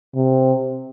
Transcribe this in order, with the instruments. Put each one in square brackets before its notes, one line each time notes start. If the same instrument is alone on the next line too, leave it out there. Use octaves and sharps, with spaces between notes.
[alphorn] C3